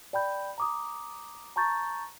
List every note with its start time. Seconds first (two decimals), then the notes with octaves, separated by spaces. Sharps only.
0.13 D5 G5 B5 G6
0.58 A#5 D6 D#6
1.56 A5 A#5 C#6 G6 A6